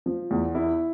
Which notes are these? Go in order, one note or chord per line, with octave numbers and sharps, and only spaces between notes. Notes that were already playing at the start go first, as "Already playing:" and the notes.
F3
E2
E4